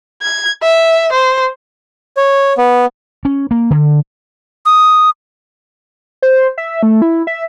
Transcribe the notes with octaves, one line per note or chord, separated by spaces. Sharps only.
G#6
E5
C5
C#5
B3
C#4
A#3
D3
D#6
C5
E5
A3
E4
E5